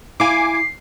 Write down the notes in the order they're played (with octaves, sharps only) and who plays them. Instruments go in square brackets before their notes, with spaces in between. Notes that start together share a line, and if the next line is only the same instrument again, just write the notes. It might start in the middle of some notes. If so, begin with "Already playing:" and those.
[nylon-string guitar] E4 F5 [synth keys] G#5 D6 [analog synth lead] C7